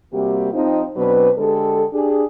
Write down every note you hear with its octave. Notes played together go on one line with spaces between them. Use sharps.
C3 G3 A#3 F#4 G4
F3 C4 D#4
B2 F#3 C4 D4 B4
D3 G#3 G4 A4
D4 G4 G#4